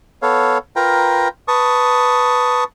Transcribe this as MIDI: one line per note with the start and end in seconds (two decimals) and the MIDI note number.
0.22 0.58 59
0.22 0.58 69
0.22 0.58 73
0.22 0.58 77
0.76 1.28 65
0.76 1.28 70
0.76 1.28 71
0.76 1.28 79
0.76 1.28 82
1.48 2.64 71
1.48 2.64 81
1.48 2.64 85
1.48 2.64 87